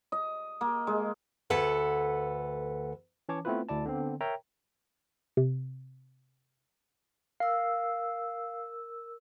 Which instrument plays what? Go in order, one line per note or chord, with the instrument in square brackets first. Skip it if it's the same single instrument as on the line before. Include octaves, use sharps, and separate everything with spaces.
[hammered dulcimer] D#5
A#3
G#3
[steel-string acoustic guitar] D2 A4 B4 F#5
[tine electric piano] E3 C#4 C#5 A5 D6
A3 B3 C4 E4 F4 B4
D2 E4 D5 A5
D3 B3 C4
A#4 C#5 E5 G5 A#5
[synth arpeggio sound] C3
[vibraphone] A#4 E6 [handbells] F5